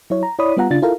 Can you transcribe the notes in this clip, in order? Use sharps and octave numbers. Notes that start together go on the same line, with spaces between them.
F#3 E4 C#5
A#5
E4 C#5 D5 B5 D#6
G3 B3 F4 F#5 A#5
C#3 D4 F4 A6
E4 F4 A4 A#4 F5 A#5